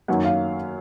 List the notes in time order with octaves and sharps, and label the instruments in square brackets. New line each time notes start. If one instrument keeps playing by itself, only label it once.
[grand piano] F#2 D#3 F#3 A#3 [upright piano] F#5
[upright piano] F5